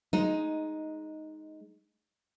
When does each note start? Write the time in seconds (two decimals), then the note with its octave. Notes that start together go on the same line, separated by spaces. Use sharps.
0.13 G#3 D#4